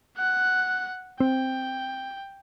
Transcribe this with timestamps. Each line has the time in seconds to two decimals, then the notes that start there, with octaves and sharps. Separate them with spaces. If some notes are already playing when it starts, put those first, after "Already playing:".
0.17 F#5 F#6
1.20 C4 G5